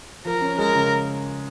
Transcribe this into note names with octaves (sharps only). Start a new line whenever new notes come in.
F3 A#4
C#4
G#3 A#4
C#3